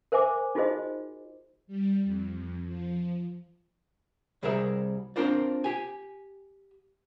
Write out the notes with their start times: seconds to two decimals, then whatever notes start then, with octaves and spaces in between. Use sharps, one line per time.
0.12 A#4 C5 E5 G#5 D6
0.55 D#4 F4 F#4 G#4 C5 D#5
1.67 G3
2.05 F2
2.66 F3
4.43 C2 C3 G3 G#4 A#4 E5
5.16 C4 D4 F4 A#4 C5 D5
5.64 G4 G#5